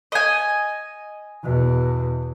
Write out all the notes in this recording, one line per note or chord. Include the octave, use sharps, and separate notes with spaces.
D#5 G#5
E2 B2